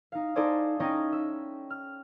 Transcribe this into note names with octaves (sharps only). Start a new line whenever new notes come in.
D#4 F5
D#4 A4 C5 D5 G#5 D#6
C#4 D#4 D#5 G5
E5
F6